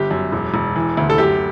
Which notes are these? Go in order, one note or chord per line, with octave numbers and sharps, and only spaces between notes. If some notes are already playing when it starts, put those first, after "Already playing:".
Already playing: G1 G4
F#2
E1
E1
E3
D2
A4
F#2 G4